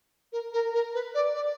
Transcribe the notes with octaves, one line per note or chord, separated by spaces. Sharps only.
A#4
A#4
A#4
B4
D5
D5